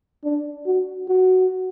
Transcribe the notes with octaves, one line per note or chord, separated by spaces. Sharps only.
D4
F#4
F#4